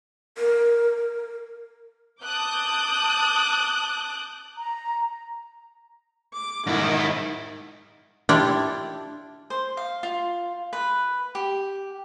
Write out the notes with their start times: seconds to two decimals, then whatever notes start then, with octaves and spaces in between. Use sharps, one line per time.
0.37 A#4
2.24 A5 D6 D#6 F#6 G6
4.58 A#5
6.34 D6
6.67 G#2 D#3 E4
8.29 D4 E4 F4 G4 D5
9.50 C5
9.77 F5
10.03 F4
10.73 B4
11.35 G4